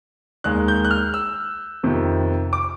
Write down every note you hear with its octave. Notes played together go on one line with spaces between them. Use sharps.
D#2 D#3 G#3 F#6
G6
F#6
F6
E6
F2 C3 D#3
D6